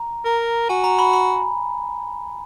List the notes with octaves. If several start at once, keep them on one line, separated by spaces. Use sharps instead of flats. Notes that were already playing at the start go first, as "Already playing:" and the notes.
Already playing: A#5
A#4
F#4 G#5
A#5
B5
B5